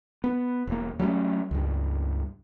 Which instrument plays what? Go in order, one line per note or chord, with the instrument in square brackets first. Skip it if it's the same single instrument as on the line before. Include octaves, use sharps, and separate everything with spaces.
[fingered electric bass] B3
E1 A#3
F#3 G3 A3 C#4
C#2 G2